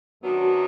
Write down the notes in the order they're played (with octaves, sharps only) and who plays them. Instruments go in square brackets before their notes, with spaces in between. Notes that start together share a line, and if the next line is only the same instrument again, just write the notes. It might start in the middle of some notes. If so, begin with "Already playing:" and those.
[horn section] F#2 D#3 F#3 B3 D4 [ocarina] F#4